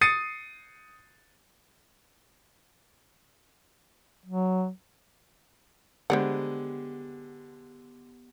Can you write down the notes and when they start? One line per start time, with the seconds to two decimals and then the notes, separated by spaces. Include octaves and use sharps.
0.01 D#6 A6 C7 C#7 D#7
4.26 F#3
6.10 D3 G#3 B3 G4 C5 D5 F#5